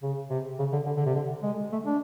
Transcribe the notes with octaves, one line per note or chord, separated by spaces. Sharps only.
C#3
C3
C#3
D3
D3
D3
C3
D3
G#3
A3
D4